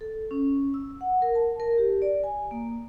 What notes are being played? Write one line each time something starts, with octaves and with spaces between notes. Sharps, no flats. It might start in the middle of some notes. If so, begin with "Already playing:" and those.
A4
C#4
E6
F#5
A#4
A5
A#4
G4
D5
G#5
A#3